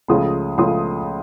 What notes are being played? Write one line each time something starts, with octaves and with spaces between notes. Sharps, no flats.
C#2 C#3 F3 A3 C6 D#6
C#2 C#3 F3 A3 C6 D#6